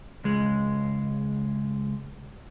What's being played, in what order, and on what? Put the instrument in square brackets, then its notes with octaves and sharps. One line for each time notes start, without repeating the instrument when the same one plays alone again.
[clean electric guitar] C#2 G#3